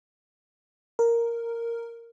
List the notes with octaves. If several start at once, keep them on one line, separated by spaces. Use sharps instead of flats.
A#4